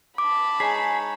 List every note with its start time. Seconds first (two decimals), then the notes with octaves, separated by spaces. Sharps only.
0.18 A5 B5 D6
0.60 G#3 D#4 G#4 C#5 B6